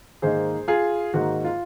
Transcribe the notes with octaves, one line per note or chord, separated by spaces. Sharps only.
G#2 D#3 A#3 D#4 G#4 C5
F4 G#4
G#2 D#3 A#3 D#4 F#4
F4